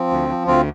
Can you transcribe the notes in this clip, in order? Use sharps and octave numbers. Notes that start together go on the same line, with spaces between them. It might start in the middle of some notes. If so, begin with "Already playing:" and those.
Already playing: F3 C4
D2
F3
D2 C4 F4